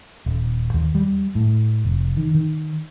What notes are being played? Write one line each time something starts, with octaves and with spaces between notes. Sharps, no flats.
D#1
D#2
G3
A2
F1
D#3
D#3